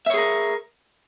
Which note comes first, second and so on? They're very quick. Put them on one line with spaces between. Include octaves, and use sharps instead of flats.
E5 C#5 G#4 A#4